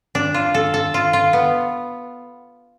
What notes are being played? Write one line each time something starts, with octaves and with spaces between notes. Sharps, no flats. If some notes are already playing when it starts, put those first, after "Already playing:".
D4
F4
A4
A4
F4
F4
B3